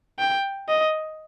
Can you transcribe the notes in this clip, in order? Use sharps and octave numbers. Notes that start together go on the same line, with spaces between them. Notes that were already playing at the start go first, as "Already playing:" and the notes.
G5
D#5